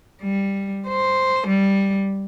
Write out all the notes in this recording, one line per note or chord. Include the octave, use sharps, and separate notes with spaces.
G3
C5
G3